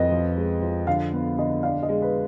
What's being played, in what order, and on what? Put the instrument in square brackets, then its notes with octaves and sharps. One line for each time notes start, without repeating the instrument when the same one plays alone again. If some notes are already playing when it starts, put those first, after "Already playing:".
Already playing: [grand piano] F2 [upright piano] B4 D#5
[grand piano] F3
G#3
F3
[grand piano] D3 [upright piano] F5
[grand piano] B3
[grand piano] D3 [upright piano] D#5
[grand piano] D4 [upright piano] F5
[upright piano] D#5
[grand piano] G#3
[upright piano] B4